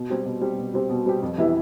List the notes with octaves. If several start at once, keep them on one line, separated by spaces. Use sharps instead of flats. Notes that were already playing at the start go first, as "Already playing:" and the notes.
Already playing: B2
G3 C4 G4
B2
G3 C4 G4
B2
G3 C4 G4
B2
G3 C4 G4
F2
E3 B3 E4 G4